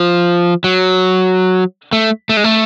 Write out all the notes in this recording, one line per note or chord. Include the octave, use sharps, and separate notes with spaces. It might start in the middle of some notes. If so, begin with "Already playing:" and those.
Already playing: F3
F#3
A3
A3
G#3
A3